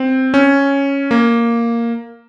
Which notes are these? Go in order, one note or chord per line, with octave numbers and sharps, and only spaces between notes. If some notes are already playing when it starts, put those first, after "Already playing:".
Already playing: C4
C#4
A#3